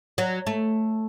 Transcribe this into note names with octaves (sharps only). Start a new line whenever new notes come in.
F#3
A3